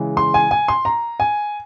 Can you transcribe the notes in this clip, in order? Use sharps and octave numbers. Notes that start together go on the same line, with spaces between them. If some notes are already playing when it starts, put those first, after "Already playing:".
Already playing: C#3 E3 G#3
C6
G#5
G#5
C6
A#5
G#5